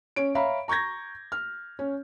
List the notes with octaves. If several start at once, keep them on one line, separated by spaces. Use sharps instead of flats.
C#4 C#5 D7
C#5 E5 F5 A#5 B5
A#5 C#6 G6 G#6 A#6
F6
C#4